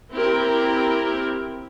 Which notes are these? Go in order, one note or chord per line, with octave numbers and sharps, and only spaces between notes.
C4 E4 G4 A#4